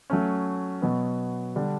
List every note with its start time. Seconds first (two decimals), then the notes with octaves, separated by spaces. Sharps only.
0.10 F#3 A3 C#4
0.82 B2 F#3 B3
1.56 D3 G3 D4